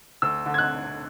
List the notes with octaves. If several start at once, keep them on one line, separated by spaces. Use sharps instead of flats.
D2 E6
D3
G#6
F#6